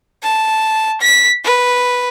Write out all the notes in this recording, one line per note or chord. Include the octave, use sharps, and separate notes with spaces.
A5
B6
B4